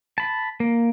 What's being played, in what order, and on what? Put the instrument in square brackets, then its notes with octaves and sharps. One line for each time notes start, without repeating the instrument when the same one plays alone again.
[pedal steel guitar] A5 B5
A#3